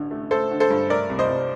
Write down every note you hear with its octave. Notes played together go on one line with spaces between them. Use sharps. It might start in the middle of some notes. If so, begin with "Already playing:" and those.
Already playing: A1 D3
A3
A3 A4 C5
D3
A4 C5
G2
A3 A#4 D5
C2
C5 D#5
C2